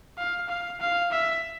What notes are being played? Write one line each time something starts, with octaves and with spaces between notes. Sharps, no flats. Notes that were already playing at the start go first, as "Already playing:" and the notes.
F5
F5
F5
E5